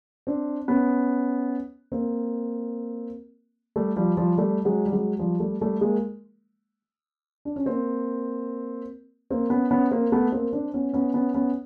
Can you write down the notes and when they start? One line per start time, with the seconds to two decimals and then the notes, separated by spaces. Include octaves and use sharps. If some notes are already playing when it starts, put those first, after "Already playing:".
0.27 C4 D4
0.68 B3 C#4
1.92 A#3 C4
3.76 G3 A3
3.96 F3 G3
4.17 F3 G3
4.37 G3 A3
4.65 F#3 G#3
4.86 G3
4.92 F#3 G#3
5.19 F3 G3
5.40 G3 A3
5.61 G3 A3
5.81 G#3 A#3
7.45 D4
7.56 C#4
7.65 A#3 C4
9.31 A#3 C4
9.50 B3 C#4
9.71 B3 C#4
9.91 A#3 C4
10.12 A3 B3
10.32 A#3 C4
10.53 C4 D4
10.74 B3 C#4
10.93 B3 C#4
11.14 B3 C#4
11.35 B3 C#4